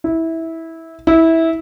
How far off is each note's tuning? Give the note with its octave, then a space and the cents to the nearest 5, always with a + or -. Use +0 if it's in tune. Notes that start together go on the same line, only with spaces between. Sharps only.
E4 -15
E4 -15